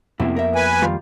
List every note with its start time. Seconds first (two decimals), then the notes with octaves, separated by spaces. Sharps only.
0.20 F2 C3 A#3 B3 E4
0.36 A#4 E5
0.55 B4 G#5
0.82 D#3 G3 F4